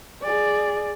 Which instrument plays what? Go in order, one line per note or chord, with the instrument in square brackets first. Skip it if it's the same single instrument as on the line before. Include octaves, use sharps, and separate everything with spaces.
[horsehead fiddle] G#4 D5